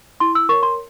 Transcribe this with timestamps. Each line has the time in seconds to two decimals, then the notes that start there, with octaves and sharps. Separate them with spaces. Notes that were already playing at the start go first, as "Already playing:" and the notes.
0.20 E4 C6
0.35 E6
0.49 A#4 C#5 C#6
0.63 C6